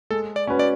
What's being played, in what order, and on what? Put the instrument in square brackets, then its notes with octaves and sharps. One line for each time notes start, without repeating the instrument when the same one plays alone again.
[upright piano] G#3 [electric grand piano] A4
[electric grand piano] D5
[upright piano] C#4 F#4 B4
[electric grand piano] D5